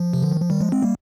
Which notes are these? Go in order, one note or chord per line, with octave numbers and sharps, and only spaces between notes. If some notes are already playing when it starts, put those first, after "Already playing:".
Already playing: F3
C3
D3
D#3
F3
D#3 G3
F3 G#3
G#3 C4
G3 A#3